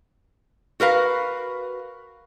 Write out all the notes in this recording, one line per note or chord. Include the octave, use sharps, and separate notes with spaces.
F#4 A#4 B4 F5